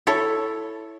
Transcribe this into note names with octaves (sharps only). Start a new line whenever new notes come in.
E4 A4 C#5